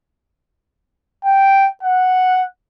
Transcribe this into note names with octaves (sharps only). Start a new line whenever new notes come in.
G5
F#5